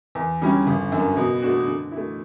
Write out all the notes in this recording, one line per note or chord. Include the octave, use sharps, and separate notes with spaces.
E2
D3 G3 C#4 E4
G1
F#2 D3
B2
A3 D4 F#4
D3
E4
A3